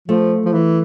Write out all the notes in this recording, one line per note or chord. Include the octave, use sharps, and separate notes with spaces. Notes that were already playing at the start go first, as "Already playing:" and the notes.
F3 A3
F3
E3